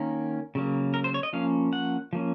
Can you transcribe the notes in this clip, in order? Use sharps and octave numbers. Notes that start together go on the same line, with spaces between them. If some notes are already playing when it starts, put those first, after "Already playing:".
Already playing: D#3 A#3 C#4
C#3 F#3 A#3
A#4
C5
C#5
D#5
F3 A#3 C#4 F5
F#5
F3 A#3 C#4